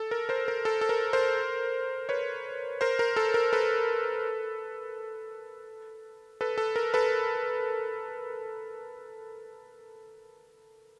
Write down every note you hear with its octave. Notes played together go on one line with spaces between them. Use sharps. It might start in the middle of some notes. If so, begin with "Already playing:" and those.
Already playing: A4
A#4
A#4 C5
A#4
A4
A4
A#4
A#4 C5
B4 C#5
A#4 C5
A#4
A4
A#4
A4 B4
A4 B4
A4
A#4
A4 B4